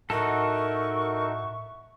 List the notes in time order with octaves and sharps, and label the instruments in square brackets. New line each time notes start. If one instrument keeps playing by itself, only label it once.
[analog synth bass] A2 [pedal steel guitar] D#4 F#4 A4 [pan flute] A#4 [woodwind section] E5 F#5 C#6